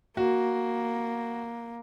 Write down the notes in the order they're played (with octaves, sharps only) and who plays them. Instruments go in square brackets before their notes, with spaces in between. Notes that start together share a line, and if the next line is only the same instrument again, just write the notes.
[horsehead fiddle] A#3 [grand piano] F#4